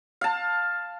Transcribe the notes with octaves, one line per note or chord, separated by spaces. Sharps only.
F5 A5